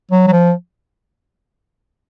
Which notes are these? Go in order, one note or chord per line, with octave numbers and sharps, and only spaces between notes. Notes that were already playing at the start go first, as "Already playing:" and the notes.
F#3
F#3
F3